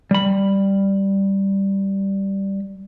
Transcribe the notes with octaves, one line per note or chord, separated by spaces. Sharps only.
G3 B5